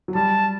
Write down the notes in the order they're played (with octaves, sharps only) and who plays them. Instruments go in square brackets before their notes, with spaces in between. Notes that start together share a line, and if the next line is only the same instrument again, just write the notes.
[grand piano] F#3
[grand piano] G3 [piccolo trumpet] A5